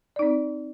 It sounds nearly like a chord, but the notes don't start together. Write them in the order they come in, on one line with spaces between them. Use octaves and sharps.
D5 D#4 C4